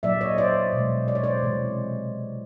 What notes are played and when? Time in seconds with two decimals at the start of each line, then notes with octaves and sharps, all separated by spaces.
0.03 A#2 F#3 A#3 D5 E5
0.21 C#5 D#5
0.38 C5 D5
0.73 B2
0.78 G#3
1.08 D5
1.15 C#5
1.24 C5 D5
1.42 C3 E3 G#3